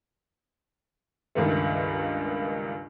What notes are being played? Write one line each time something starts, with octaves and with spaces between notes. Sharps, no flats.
C#2 G2 D#3 A3